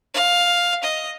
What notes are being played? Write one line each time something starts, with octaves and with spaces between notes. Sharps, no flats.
F5
D#5